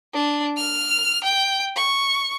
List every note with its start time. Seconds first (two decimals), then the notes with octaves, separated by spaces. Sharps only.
0.14 D4
0.57 F6
1.24 G5
1.76 C#6